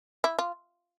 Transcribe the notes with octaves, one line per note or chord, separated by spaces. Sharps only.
E4
F4